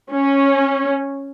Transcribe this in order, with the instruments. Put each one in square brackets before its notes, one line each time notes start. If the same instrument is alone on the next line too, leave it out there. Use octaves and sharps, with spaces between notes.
[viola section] C#4